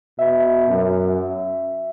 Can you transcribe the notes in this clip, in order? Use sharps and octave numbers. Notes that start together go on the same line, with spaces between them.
B2 E5
F#2